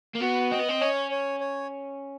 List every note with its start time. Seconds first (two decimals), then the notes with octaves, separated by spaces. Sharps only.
0.15 A#3
0.20 B3 F#4
0.51 C4 D#5
0.59 B3
0.68 C4
0.81 C#4 C#5
1.11 C#5
1.40 C#5